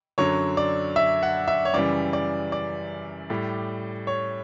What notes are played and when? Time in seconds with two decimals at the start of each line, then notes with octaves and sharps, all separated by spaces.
0.18 F#2 D3 F#3 C#5
0.57 D5
0.96 E5
1.23 F#5
1.48 E5
1.65 C#5
1.73 F#2 C#3 E3 G3 D5
2.13 D5
2.52 D5
3.30 A2 G3
4.07 C#5